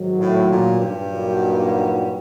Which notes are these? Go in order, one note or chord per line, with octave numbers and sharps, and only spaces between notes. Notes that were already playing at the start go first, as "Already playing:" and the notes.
Already playing: G#2 D#3 F#3
A2
A#2
G2
A#2 F#3 A#3 D#4 F#4